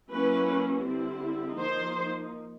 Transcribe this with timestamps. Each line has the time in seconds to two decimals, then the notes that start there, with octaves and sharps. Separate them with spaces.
0.11 F#3 A#3 C#4 E4 B4
0.85 D3 G3 C4 E4
1.57 F3 A#3 D#4 C5